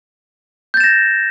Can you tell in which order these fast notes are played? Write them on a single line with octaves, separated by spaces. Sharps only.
G6 A6 E7 A#6